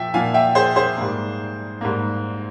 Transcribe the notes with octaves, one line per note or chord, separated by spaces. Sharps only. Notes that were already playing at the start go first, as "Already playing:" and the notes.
Already playing: A#2 F3 E5 G5
A#2 F3 A#3 F5 G#5
E5 G5
G#4 C5
G#4 C5
G#2 G3 A#3
G#2 G3 A#3